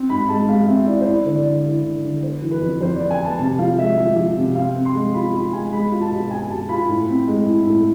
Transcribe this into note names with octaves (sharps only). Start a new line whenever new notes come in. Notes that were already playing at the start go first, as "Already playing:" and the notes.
Already playing: C4
G#2 B5
G#3 A5
G#3 F5
C4 E5
E4 D5
C5
E4 D5
D3 C5
D5
D3
E4
D3
D3
B3 C5
E3
B4
F2
F2 C5
D5
B3
G#5
B3 A5
C3 A5
F3 F5
G#3 E5
F3 E5
F3
C3
C4 F5
C4
C6
G#3
F4 B5
F4 B5
G#3 G#5
G#3 B5
F4
A5
B2
B3 G#5
B2 A5
F4 B5
A2
C4
G#3
E4
A2